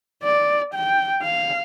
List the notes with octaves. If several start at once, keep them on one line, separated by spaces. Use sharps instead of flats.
D5
G5
F5